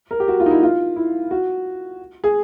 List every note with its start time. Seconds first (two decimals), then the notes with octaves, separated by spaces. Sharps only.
0.11 A#4
0.20 G4
0.28 F#4
0.40 F4
0.46 D#4
0.51 E4
0.63 F4
0.96 E4
1.31 F#4
2.24 G#4